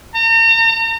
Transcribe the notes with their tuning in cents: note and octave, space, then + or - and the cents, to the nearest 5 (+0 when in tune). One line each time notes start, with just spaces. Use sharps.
A#5 -40